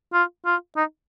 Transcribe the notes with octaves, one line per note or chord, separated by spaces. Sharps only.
F4
F4
D#4